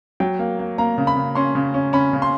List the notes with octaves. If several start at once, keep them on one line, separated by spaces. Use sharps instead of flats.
F#3 G5
A#3
A#3
A#3 A#5
C#3
B5
C#3
C#4 C6
C#3
C#4
C#4 B5
C#3
C6